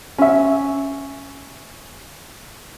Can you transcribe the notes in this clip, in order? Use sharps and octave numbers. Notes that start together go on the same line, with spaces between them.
C#4 E5